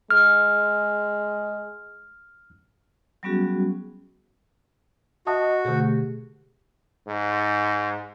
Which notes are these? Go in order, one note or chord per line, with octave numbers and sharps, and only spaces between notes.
G#3 F6
F#3 G3 B3 C#4 F#4 G#4
F#4 D#5 E5 A5 D#6
B2 D3 A3 G4 G#4
G#2